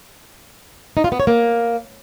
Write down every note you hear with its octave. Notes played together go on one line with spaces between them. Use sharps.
D#4
F4
B3
C#5
A#3